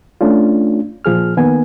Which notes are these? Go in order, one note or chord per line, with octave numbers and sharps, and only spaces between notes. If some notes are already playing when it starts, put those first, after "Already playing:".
A3 C#4 D4 F4
A#2 F3 G#4 F6
D#3 A#3 B3 G#5